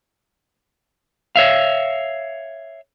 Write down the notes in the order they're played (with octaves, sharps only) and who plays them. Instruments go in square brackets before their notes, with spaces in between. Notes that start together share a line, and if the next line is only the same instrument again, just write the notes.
[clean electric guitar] C#5 E5 F5